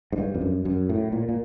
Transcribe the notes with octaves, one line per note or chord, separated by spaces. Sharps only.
G#2
G2
F2
F#2
F#2
A2
A#2
A#2